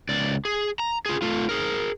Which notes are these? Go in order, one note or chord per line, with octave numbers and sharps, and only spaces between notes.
C#2 D5
G#4
A#5
F4 G#4
A3 F4
G#4 A#4